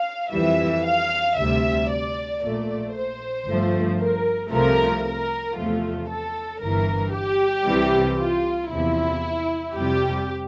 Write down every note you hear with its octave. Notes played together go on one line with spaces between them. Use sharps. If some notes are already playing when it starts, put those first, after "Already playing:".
Already playing: F5
F2 E3 G3 E5
F5
D2 C3 G3 E5
D5
A#1 A#2 A3 D5
C5
G1 G2 F3 A3
A#4
C2 C3 F3 A3 A#4
A#4
E2 C3 F3 A3 F4
A4
G1 G2 E3 A#4
G4
C2 C3 E3 G3
F4
E2 C3 F3 E4
F2 C3 G3 G4